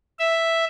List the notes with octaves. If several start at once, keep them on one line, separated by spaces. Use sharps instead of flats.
E5